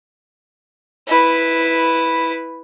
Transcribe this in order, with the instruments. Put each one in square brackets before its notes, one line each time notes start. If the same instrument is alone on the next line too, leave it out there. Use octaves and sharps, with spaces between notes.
[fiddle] E4 B4